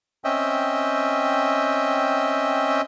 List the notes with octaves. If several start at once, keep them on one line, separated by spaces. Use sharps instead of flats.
C4 C#4 D#5 E5 G5